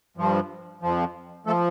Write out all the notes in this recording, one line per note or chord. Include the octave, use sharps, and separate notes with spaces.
G2 F3
F2 F3
F3 A3 A4